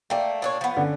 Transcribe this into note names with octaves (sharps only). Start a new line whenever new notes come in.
A3 A#3 D5 G5
A#2 D4 C#5
F3 B3
D3 C#4